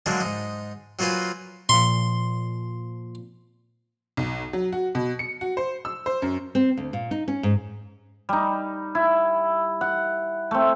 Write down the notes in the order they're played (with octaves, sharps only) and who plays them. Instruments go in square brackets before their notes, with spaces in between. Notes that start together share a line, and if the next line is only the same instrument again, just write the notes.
[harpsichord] D3 F#3 G#3 A#3 D4
G#2 D#4
F#3 A#3 F4 B4 C5 G#5
[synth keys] A#2 F3 [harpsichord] C6
[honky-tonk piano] B1
F#3
F#4
B2
C#7
F#4
C5
E6
C5
F#2
[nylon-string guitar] C4
D2
A#2
D#4
C#4
G#2
[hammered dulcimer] G3 D#4
E4
F#5
A3 C4